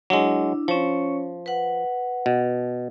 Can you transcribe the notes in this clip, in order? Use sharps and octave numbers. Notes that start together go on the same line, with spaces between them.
F#3 G#3 D4 E4
F3 C#4 C#5
B4 F#5
B2